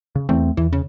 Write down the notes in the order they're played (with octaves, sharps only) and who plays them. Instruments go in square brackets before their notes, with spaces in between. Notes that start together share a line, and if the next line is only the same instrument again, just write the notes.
[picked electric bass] C#3
[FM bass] E2 [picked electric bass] A3 C4
[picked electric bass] E2 [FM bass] E3
[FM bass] C#3